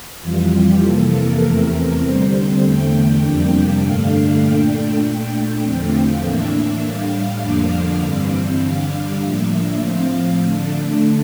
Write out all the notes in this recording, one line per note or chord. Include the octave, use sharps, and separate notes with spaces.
F2 E3 G3 F4
G4
F2 C3 E3 A#3 A4
A#4
E2 C3 E3 A3 C4
D3 G3 C4 C5
C5
E2 D3 A3 G5
F2 C3 G3 A#3 D4
G2 D3 A3 D4 F5
F5
A#2 A3 D4 G5
A#2 A3 D4
E2 D3 F3 A3 C4 G5
F5
A2 E3 A#3 D4 E5
E5
A2 G3 D4 F5
F2 D3 F3 A#3 D4
G2 E3 G3 C4
D3 G3 D4 F5
A2 F3 A#3 D4 E5
A2 F3 C4 F5
D3 A3 D4